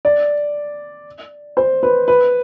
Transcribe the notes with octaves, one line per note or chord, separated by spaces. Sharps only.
D5
C5
B4
B4